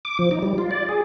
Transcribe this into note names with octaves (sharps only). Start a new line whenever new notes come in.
D6
F3
D#4
G3
F4
D5
G#4